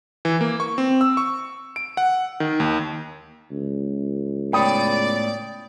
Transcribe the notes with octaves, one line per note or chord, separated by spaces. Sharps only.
E3
A#3
C#6
C4
E6
C#6
D7
F#5
D#3
D#2
C#2
A2 B3 C#5 D5 G5 B5 D#6